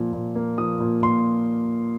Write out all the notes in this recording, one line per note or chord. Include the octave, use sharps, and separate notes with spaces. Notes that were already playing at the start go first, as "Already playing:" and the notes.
Already playing: A#2 F3
A#2
A#3
F3 D#6
A#2
A#2 C6